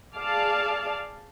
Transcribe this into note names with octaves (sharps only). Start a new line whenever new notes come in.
G#4 D5 F5 A5